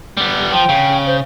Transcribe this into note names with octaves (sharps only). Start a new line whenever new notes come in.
G3 B3
F3 G5
C#3
C5